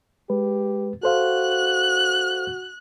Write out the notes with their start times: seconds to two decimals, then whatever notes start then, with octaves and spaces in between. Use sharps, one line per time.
0.30 G#3 G4 B4
1.03 F#4 A4 C5 F5 F#6